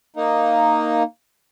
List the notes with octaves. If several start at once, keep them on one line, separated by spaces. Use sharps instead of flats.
A#3 D#4